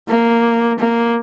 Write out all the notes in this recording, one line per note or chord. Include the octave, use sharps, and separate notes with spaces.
A#3
A#3